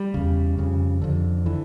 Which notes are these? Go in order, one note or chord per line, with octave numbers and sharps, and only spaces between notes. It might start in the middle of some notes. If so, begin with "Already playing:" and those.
Already playing: G3
E2 C#3
F2 C#3
F2 D3
D3 E3